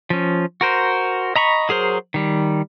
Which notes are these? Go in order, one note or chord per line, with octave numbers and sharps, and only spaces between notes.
F3 C#4
F#4 A#4 C5
D#5 A#5 B5 C#6
F#3 G#4 A#4 C5
D#3 G3